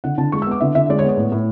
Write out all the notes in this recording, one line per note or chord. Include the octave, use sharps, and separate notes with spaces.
D3 F#5
D3 A5
G#3 C#6
E6
B3 D6
D3 E5
D3 E5
G#3 D5
C#5
B3
C#5
A2
A2